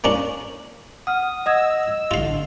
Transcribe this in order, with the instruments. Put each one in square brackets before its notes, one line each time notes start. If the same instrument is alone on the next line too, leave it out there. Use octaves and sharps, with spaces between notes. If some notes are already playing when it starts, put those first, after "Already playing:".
[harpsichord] A#3 C#4 D4 [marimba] D6
[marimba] F#5 F6 [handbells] D#6
[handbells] D#5 [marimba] F#5 D#6 G#6 [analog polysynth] E6
[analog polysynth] A1 D3 [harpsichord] F4 F5